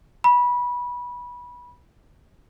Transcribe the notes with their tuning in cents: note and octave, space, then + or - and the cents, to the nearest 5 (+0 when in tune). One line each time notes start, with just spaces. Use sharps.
B5 -20